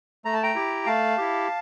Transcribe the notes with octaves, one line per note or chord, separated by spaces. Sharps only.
A3 A#5
A5
G5 A#5
E4 G4
A3 F5 A5
E4 G4